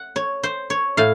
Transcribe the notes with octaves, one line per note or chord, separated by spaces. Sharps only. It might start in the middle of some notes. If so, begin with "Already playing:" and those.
Already playing: F#5
C#5
C5
C#5
A2 F5